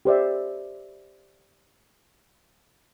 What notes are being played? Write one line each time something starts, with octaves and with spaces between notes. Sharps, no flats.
G4 C5 D5 E5